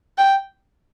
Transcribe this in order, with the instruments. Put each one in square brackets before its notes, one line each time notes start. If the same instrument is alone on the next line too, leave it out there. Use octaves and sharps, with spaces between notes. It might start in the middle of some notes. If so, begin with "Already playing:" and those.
[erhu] G5